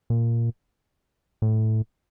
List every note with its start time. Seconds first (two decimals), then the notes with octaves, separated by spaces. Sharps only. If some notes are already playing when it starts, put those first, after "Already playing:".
0.10 A#2
1.42 A2